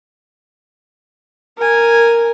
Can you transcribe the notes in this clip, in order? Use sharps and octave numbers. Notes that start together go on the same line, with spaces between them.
A#4 G#5